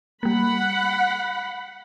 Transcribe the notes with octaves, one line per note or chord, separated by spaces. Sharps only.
G3 A#3 F#5 B5